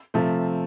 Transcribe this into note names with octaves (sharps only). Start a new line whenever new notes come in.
C3 F3 A3